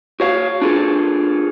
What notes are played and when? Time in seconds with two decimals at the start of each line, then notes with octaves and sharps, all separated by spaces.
0.20 F#4 C#5 F5
0.62 D4 F4 G#4 A4